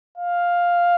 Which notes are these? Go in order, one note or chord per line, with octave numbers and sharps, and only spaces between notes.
F5